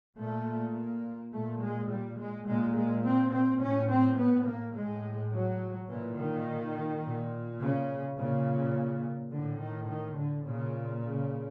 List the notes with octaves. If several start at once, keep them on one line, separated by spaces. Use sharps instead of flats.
A#2 A3
A#3
A#2 A3
G#3
G3
G#3
A#2 G#3
G#3
C4
C4
A2 C#4
C4
B3
A#3
A2 G#3
F#3
A#2 E3
D#3
A#2
C#3
A#2 C#3
A2 D3
D#3
D#3
D3
A#2 C#3
C#3